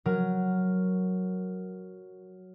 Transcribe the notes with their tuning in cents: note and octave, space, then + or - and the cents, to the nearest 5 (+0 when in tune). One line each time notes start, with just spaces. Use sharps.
F#3 +0 A#4 +0